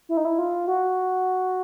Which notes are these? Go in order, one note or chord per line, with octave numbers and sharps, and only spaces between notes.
E4
D#4
E4
F4
F#4